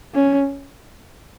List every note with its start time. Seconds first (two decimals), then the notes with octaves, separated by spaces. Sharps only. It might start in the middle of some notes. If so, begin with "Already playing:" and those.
0.14 C#4